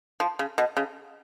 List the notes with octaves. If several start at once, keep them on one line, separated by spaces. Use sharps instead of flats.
F3
C#3
B2
C#3